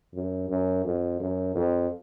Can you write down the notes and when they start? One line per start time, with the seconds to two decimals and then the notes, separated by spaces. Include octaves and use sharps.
0.14 F#2
0.50 F#2
0.85 F2
1.20 F#2
1.55 F2